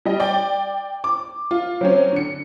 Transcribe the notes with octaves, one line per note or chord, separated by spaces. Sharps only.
G3 D#5
D5 G5
D6
F4
F#3 C4 C#4
D3 C#7